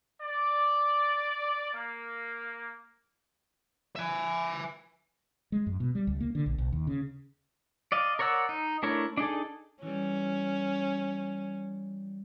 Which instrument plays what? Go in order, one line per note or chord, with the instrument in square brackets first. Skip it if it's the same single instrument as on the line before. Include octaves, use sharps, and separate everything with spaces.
[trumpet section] D5
A#3
[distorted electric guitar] E5 G#5
[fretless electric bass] G#3
F#2
B2
G3
C#2
A#3
D3
A#1
B1
D#2
C#3
[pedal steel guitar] D5 D#5 F5
A#4 C#5 D5 F#5 E6
D#4
A3 D4 E4 A#4 C#5
D4 D#4 G#4 A4
[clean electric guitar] E3 G3 [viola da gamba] C#4